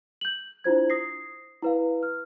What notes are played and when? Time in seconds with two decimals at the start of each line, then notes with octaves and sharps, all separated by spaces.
0.21 G6 F#7
0.64 D4 E4 F4 C5 G#6
0.90 D#6 A#6 C7
1.62 E4 B4 F5
2.03 F6